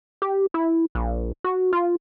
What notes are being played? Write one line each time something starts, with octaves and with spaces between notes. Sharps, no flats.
G4
E4
A#1
F#4
F4